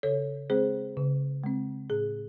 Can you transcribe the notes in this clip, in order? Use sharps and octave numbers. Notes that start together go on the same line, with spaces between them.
C#3 A4 C#5
G#3 C4 G#4 C5
C#3
G#3 C4
A2 G#4